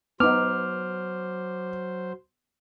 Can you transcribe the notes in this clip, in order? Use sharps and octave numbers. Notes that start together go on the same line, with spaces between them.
F#3 B3 D#4 C5 D6 F6